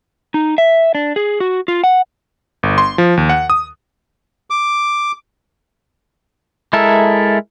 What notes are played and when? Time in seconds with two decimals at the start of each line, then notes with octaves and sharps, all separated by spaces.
0.34 D#4
0.58 E5
0.95 D4
1.16 G#4
1.40 F#4
1.68 F4
1.84 F#5
2.63 G1
2.78 C6
2.98 F3
3.17 D#2
3.29 F#5
3.50 D#6
4.50 D6
6.73 G#3 E4 A4 A#4 E5